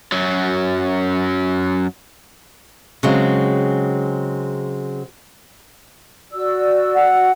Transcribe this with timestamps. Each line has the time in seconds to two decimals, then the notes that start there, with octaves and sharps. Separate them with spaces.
0.12 F#2 F#3
3.03 C#3 F#3 G#3 C4
6.32 F#4 D5 E6
6.95 F#5